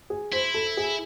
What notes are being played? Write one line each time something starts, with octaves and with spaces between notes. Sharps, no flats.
G#4
E4 C5
A4
G#4